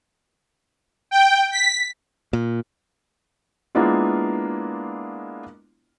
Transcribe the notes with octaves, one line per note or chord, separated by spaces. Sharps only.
G5
B6
A#2
G#3 A#3 B3 D4 E4 F4